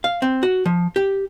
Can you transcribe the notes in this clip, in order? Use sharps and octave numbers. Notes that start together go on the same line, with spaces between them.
F5
C4
F#4
F3
G4